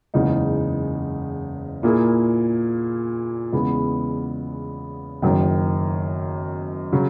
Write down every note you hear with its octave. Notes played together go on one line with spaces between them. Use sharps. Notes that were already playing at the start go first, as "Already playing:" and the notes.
F#1 E2 C#3 G#3 D#4
A#2 A#3 E4 G#4
E2 C#3 G#3 B3
F#1 F#2 D#3
C#3 F#3